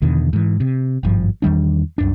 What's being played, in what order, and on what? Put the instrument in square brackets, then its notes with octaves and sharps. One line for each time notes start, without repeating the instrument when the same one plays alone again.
[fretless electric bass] E2 B2 D3 D#3
G#2 E3
C3
G#1 G2 F3
E2 D#3 G3 D4
C2 F#2 D4